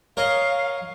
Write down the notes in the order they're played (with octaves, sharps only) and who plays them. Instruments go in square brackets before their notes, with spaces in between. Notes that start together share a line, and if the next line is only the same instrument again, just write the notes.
[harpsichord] A#4 C#5 D#5 [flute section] F5